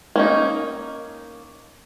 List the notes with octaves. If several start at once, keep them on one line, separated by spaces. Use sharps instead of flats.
A#3 C#4 D#4